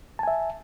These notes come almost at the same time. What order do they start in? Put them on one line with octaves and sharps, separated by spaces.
A5 G#5 E5